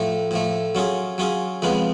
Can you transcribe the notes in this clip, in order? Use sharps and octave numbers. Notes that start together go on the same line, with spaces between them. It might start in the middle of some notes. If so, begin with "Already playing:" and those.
Already playing: A2 F3 A3
A2 F3 A3
F#3 C#4 F4 G#4
F#3 C#4 F4 G#4
F2 C#3 G#3 B3 F4